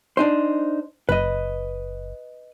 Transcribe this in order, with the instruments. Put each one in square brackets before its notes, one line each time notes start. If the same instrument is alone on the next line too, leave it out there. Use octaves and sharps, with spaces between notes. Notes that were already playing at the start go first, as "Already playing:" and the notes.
[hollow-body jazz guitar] D4 D#4 C5
[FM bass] F#1 [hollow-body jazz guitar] B4 D#5